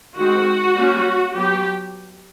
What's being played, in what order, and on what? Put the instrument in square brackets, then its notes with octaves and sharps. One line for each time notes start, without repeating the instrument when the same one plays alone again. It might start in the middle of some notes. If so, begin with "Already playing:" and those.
[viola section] D#3 G#3 C4 F#4
G3 A#3 C#4
F#3 B3 G4